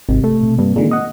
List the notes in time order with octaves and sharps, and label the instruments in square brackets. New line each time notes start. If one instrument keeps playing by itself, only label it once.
[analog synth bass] G#1 [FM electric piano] C3
[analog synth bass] A3
[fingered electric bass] B2
[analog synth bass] G2 [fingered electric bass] A#3 C4
[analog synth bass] A#2 [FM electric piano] D3 D#3 G#3
[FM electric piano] D#5 F#5